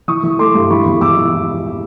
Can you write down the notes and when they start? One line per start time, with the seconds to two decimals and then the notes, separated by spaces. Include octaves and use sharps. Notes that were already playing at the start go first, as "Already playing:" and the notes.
0.08 E3 C#6 D#6
0.23 E3
0.39 A3 C6 D6
0.55 G2
0.70 E3 B5 C#6
0.86 E2
1.01 E3 D6 E6
1.17 E3